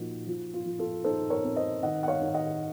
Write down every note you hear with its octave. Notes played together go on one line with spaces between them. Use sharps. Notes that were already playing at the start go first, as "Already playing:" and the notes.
Already playing: A#2 F3 A#3 D#4 F#4
F3 F4
F4
F3
F4 A4
D#4 A4 C5
A#4 C#5
C4
C5 D#5
D#3 D#5 F#5
F#5
C#5 F5
D#3
D#5 F#5